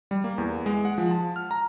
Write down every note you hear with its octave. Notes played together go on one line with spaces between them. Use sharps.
G3
A#3
E2
G#3
F#5
F3
A5
F6
A#5